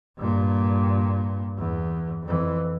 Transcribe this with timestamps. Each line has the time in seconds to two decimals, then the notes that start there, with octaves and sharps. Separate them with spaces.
0.17 G2 A#2
1.58 E2
2.23 F2 E3